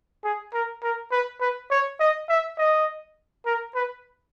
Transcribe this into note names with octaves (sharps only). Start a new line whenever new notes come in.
G#4
A#4
A#4
B4
B4
C#5
D#5
E5
D#5
A#4
B4